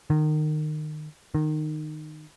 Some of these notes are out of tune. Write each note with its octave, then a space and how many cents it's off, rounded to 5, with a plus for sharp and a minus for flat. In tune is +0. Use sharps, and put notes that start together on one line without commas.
D#3 -25
D#3 -20